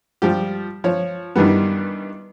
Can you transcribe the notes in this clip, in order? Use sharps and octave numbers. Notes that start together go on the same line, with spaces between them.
F3 G3 G4
F3 C#5
G2 D#3 E3 G3 B3